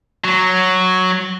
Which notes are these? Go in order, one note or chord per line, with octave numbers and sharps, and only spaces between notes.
F#3